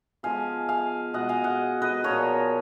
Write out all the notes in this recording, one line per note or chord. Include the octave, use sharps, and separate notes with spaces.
F3 G#3 B3 F5 G#5
F5 G#5
B2 G#3 B3 D#5 F#5
F5 G#5
D#5 F#5
B4 D#5
A#2 F3 B3 A#4 C#5